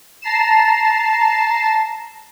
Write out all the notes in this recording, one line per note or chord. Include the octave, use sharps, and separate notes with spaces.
A5 A#5 C7 E7